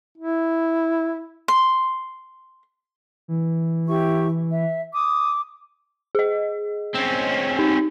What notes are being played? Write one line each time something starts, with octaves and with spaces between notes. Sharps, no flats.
E4
C6
E3
E4 G4 C#6
E5
D6 D#6
G#4 D#5
C4 C#4
D#4